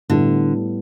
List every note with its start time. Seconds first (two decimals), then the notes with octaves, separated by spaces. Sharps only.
0.10 A2 D3 G3 B3 E4